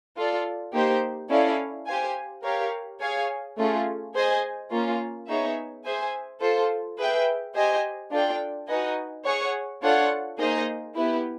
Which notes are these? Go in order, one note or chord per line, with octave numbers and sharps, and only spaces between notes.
F4 A4 D5
A#3 D#4 G4 C5
C#4 E4 A4 D5 F5
G4 C5 F5 G#5
G4 A#4 C#5 F5
G#4 C#5 F5 G#5
A3 C#4 F4 G#4
G#4 C5 D#5 G#5
A#3 C#4 F4
B3 D#4 G#4 C#5 E5
G#4 C5 E5 G#5
F4 A4 C5
G#4 B4 E5 G5
G4 C5 D#5 G#5
D4 F4 A4 D5 G5
D#4 F#4 B4 D#5 G#5
G#4 C#5 F#5
D4 F4 A4 C#5 F#5
A#3 D#4 G#4 C5 D#5
B3 E4 G4 B4